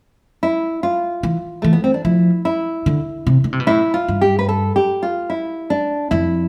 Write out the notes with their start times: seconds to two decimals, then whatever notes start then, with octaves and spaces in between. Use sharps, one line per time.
0.43 E4
0.83 F4
1.23 E3
1.62 E3 A3
1.73 B3
1.84 C4
1.94 D4
2.05 F3 E4
2.45 E4
2.86 D3
3.27 C3
3.44 D3
3.53 C3
3.60 B2
3.67 A2 E4
3.94 F4
4.08 G2
4.21 G4
4.39 B4
4.49 A4
4.76 G4
5.03 F4
5.30 E4
5.70 D4
6.11 F2 E4